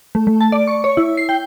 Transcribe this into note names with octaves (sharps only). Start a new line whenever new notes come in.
A3
A3
A5
D5
C#6
C#5
E4
C7
G5